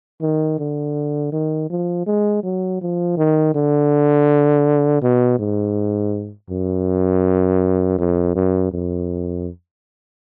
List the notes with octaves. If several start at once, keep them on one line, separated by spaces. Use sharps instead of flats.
D#3
D3
D#3
F3
G#3
F#3
F3
D#3
D3
B2
G#2
F#2
F2
F#2
F2